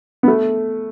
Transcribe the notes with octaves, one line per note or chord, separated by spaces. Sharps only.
B3
A3